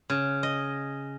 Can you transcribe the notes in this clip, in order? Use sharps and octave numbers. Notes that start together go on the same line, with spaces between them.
C#3
D#5